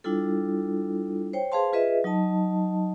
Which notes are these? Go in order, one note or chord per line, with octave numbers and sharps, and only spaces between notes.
G3 D4 E4 F4 A4
C5 C#5 G5
G#4 B4 C5 F5 A5 C6
F4 G#4 B4 D#5 E5
F#3 D#4 D#5 A5